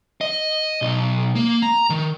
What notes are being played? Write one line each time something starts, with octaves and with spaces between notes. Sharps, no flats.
D#5
B1
A#3
A#5
D#3